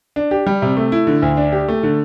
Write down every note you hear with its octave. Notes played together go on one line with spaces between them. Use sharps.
D4
G4
G3
C3
A3
E4
D3
D2
D4
G4
A3
D3